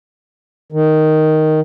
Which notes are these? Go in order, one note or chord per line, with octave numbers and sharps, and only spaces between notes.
D#3